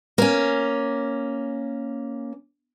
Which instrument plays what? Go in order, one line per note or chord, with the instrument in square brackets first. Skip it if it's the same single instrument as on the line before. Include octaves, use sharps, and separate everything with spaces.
[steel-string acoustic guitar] A#3 C#4